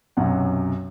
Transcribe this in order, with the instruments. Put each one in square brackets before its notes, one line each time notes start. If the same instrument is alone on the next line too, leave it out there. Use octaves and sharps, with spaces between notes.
[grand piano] B1 F#2 C3 F#5